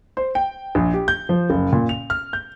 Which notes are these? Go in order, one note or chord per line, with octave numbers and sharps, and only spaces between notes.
C5
G5
A#1
G4
G6
F3
F#1
A#2
F7
F6
G6